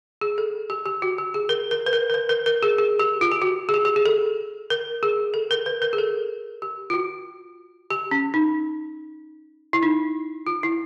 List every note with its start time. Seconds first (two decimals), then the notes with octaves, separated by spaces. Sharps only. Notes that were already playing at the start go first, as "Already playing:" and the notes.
0.21 G#4
0.38 A4
0.70 G4
0.86 G4
1.02 F#4
1.18 G4
1.34 G#4
1.49 A#4
1.71 A#4
1.86 B4
1.93 A#4
2.10 A#4
2.14 B4
2.29 A#4
2.46 A#4
2.63 G#4
2.78 G#4
2.99 G4
3.21 F4
3.32 G4
3.42 F#4
3.69 G#4
3.74 G4
3.85 G4
3.96 G#4
4.06 A4
4.70 A#4
5.03 G#4
5.34 A4
5.51 A#4
5.66 B4
5.82 A#4
5.93 G#4
5.98 A4
6.62 G4
6.90 F4
6.94 F#4
7.90 G4
8.11 C#4
8.34 D#4
9.73 E4
9.83 D#4
10.47 F4
10.63 E4